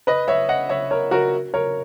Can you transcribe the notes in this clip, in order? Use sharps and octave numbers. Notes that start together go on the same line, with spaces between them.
B4 D#5
C#5 E5
D#5 F#5
C#5 E5
A#4 C#5
F#4 A#4
A#4 C#5